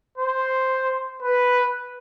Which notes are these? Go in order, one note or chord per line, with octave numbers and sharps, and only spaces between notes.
C5
B4